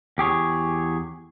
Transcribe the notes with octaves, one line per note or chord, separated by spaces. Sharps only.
E2 G4 G#4 C#5